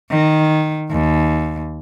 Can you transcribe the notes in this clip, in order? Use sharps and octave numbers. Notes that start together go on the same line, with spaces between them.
D#3
D#2